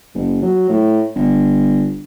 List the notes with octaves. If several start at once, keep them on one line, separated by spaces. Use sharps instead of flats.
F#1
F#3
A2
G1